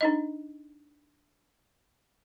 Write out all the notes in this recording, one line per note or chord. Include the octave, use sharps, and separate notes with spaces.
D4 D#4 D#5